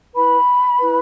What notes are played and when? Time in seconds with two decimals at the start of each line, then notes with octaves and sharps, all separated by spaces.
0.13 E4 B4 B5
0.77 E4 B4